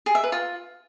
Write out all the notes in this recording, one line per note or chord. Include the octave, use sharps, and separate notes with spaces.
G#4
E5
B4
F4